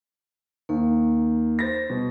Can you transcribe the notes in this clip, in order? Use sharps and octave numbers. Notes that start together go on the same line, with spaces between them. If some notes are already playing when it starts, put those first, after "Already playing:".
D#2 A#3
C5 A6 A#6
B2 G3